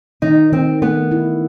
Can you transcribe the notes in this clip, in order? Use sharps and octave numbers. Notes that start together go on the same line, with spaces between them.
D#3 D#4
D#3 C4
A3 B3
E4